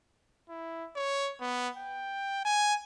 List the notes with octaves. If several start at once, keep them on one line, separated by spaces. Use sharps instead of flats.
E4
C#5
B3
G5
G#5